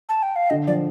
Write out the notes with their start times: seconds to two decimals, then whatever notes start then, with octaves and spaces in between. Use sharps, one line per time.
0.09 A5
0.23 G5
0.36 F5
0.50 D3 D#5
0.67 F3 D5